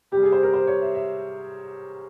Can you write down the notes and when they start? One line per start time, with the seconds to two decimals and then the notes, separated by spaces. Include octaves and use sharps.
0.12 C3 G4
0.16 G3
0.23 G#4
0.32 C5
0.43 A#4
0.53 C5
0.67 C#5
0.82 E5
0.95 E5